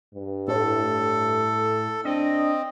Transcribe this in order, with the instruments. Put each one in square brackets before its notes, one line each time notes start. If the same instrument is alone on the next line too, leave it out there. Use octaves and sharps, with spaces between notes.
[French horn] G2
[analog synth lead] A2 [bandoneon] A4
[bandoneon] C4 [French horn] D4 [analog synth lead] D#5